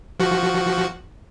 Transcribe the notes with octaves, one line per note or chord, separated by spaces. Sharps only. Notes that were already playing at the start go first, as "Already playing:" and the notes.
F3 F#4